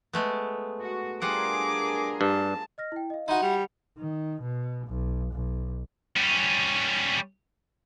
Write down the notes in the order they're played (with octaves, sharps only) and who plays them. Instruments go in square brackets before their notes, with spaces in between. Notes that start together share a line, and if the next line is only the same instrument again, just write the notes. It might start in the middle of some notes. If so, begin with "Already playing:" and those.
[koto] G#3 A3 B3
[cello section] F#4
[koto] G3 F4 F#5 [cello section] D4 G#4 A#4 [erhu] D6
[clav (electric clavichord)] G2 [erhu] A5
[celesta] D#5 F6 A#6
E4 G5
D#5 F5
[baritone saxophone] D#4 [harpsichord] E4 F#4 [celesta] C6 D#7
[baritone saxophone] G3 [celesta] F#5 C#7 F7
[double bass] D#3
B2
B1
B1
[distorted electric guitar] G3 C#4